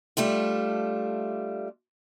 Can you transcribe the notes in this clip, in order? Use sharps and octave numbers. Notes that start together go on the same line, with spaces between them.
G3 A3 D4 F4